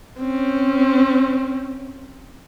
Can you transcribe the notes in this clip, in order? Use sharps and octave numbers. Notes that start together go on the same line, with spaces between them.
C4 C#4